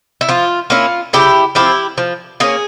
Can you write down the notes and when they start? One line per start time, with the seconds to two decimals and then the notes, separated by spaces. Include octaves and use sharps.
0.21 E4
0.29 F3 F4
0.70 A#3 C#4 E4 F4
1.13 C#3 E4 G4
1.55 F3 C4 E4 G4
1.98 F3
2.40 A#3 C#4 F4 G#4